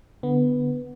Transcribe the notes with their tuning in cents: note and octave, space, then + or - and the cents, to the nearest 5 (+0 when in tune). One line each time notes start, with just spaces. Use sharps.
D3 +0 B3 +0